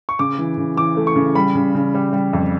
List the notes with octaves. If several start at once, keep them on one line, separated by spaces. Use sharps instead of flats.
C#6
C#3 D6
E3
C#3
E3 D6
A3
C#6
C#3
G3 B5
C#3
C#3
G3
G3
F2